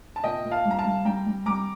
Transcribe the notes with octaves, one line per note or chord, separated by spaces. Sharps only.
A5
A#2 D#5 G5
A#2
F5 A5
G3
A#5
F5 A5
G3
G3 G5 A#5
G3
G3 A#5 D6